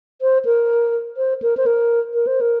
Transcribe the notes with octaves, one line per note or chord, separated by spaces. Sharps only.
C5
A#4
C5
A#4
C5
A#4
A#4
C5
A#4